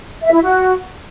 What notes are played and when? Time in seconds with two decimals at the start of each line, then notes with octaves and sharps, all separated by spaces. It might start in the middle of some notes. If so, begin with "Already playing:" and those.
0.22 E5
0.32 E4
0.42 F#4